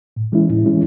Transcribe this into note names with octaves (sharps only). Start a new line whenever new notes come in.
A2
E3 G#3 C#4 E4
A2
E3 G#3 C#4 E4